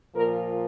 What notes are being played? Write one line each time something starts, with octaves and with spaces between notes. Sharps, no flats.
A#2 F3 A#4